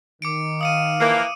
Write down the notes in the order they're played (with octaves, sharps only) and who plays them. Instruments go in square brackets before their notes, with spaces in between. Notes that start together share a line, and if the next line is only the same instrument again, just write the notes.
[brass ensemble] D#3 [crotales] D6 C#7 D7
[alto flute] F5 [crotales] D#6 C#7 D#7
[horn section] E3 F3 A#3